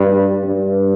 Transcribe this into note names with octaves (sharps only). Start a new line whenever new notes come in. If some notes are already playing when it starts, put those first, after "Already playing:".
Already playing: G2
G2